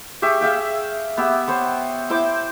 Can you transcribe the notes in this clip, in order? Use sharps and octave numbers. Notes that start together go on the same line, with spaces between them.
G4 G#4 E5 C#6
G#4 E5 F5 G5
B3 G4 E5 E6
B3 C5 C#5 G5
E4 C5 G5 D6